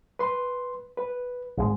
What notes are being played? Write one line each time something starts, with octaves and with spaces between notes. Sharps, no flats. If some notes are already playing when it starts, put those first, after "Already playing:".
B4 C6
B4
G#1 G#2 G#3